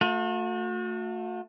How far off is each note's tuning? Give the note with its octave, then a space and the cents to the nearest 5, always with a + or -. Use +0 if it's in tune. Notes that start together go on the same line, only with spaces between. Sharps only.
A3 +20 F#4 -40